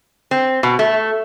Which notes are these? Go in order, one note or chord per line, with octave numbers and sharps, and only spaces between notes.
C4
B2
A3